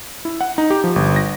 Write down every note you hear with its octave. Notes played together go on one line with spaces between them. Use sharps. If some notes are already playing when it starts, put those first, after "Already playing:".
E4
F#5
D#4
G4
F3
G1
A#6